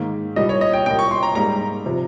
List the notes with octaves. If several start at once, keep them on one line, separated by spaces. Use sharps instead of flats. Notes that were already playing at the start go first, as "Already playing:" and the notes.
Already playing: G#2 D#3 A#3
C2 A#2 G3 D#5
C#5
D#5
G5
C2 A#2 G3 G5
C#6
C6
A#5
G#2 G3 A#3 A#5
C3 F3